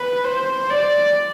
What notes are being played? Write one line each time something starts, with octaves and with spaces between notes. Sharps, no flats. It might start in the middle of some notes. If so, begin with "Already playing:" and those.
Already playing: B4
C5
D5